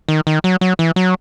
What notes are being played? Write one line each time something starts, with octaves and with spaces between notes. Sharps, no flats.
D#3
D#3
F#3
F#3
E3
F#3